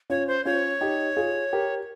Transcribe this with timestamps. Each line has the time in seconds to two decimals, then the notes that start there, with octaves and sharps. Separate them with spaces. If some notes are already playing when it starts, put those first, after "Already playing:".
0.10 C#4 F4 C#5
0.28 C5
0.45 C#4 F4 C#5
0.81 D#4 G4
1.17 F4 G#4
1.53 G4 A#4